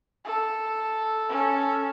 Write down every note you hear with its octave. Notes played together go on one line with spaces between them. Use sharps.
A4
C#4 A4